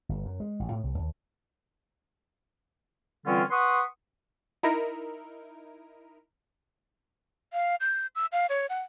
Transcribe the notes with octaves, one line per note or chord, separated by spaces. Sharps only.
G1
F#2
G#3
A1
A2
C2
D#2
D3 E3 G3 C4 C#4 F4
B4 F#5 C6 C#6 D#6
D#4 E4 A#4
F5
G6
E6
F5
C#5
F#5